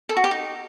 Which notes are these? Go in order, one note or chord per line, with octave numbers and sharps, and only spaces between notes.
A4
F#4
G4
D#4